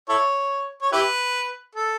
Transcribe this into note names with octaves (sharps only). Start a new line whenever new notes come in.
E4 A4 C#5
C#5
E4 G4 B4
A4